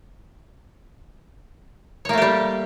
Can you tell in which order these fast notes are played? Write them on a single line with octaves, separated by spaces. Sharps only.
C#5 A#3 A3 G4 G3